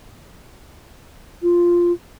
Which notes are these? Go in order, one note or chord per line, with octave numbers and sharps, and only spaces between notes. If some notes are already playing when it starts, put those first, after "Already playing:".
F4